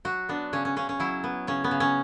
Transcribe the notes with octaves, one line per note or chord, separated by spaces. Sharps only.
F#3 F#4
B3 D4
C#3 C#4
C#4
C#3 C#4
C#4
F#3 E4
B3
C#3 C#4
B3
C#3
C#4